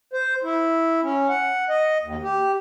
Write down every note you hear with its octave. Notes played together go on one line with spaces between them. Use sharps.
C5
E4
C#4
F#5
D#5
D#2
G4